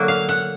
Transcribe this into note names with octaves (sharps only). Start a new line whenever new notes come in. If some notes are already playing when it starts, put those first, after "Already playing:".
Already playing: D3 F#3 A#3
F5
F#5